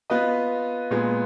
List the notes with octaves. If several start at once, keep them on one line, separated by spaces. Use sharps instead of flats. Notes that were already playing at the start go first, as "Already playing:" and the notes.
B3 F4 B4 D#5
A#2 G#3 B3